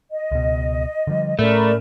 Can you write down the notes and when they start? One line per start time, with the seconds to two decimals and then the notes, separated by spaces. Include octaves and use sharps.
0.11 D#5
0.31 C#2 B2
1.07 D3 F3 G3
1.39 A2 A3 C#4 A#4 D5 B5